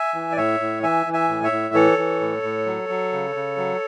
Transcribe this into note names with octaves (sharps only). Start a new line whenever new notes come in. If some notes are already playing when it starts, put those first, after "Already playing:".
Already playing: E5 G#5
E3
D5
A2 C#5 E5
A2
E3 E5 G#5
E3
E5 G#5
A2
C#5 E5
A2
E3 A4 C#5
E3
A2
A2
F#3
F#3
C#3
C#3
F#3